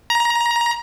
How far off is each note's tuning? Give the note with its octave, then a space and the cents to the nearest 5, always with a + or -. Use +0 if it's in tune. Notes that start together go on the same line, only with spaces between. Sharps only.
A#5 +20